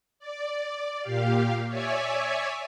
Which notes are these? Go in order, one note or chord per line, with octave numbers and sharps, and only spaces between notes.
D5
A#2 G4 F5
C#5 D5 E5 G#5